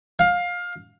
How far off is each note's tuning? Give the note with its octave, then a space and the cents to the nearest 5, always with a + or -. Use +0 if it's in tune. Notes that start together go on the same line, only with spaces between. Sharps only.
F5 +20